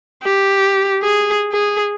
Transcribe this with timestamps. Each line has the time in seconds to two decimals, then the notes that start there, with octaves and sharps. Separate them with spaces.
0.23 G4
1.02 G#4
1.53 G#4